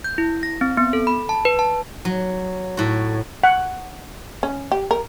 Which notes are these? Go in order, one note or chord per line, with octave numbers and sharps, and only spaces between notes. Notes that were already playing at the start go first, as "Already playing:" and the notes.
G6
E4
A#6
C4
B3
A4
B5
A5
B4
A5
F#3
A2 F#4
F#5
C#4
G4
A#4